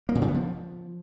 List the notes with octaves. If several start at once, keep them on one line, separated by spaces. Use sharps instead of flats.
A#3
A#2
C#3
B3
F3